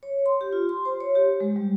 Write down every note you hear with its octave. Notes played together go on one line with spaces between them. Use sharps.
C#5
C6
G4
F4
C6
C5
C#5
G4
G#3
G3